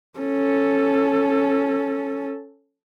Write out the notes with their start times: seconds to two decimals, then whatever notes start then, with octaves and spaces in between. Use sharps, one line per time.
0.19 C#4 A4